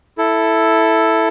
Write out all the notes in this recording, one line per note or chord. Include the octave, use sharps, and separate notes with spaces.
E4 A4